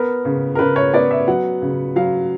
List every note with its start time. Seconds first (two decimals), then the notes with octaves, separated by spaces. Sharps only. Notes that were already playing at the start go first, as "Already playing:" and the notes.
Already playing: B3 A#4
0.25 C#3
0.55 A#4
0.59 C#3 B4
0.76 C#5
0.94 B3 D5
1.11 E5
1.28 F#3 F#5
1.62 C#3
1.96 F#3 F5